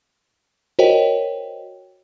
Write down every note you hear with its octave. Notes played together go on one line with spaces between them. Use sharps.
F#4 A#4 C5 C#5 D#5 G5